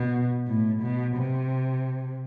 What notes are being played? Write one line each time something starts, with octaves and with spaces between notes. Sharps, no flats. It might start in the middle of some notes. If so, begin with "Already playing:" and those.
Already playing: B2
A2
B2
C3